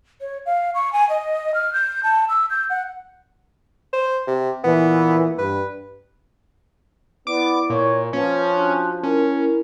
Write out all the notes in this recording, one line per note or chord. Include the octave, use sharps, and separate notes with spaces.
C#5
F5
C#6
G#5
D#5
F6
G6
A5
E6
G6
F#5
C5
C3
A#2 E3 B3
G2 B4
B3 E4 D5 D6
A#2 C#5
F3 C#4 B4
D4 F#4 F#6
C#4 E4 A#4